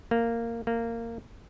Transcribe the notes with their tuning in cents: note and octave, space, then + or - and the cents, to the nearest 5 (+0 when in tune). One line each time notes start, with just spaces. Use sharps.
A#3 -10
A#3 -15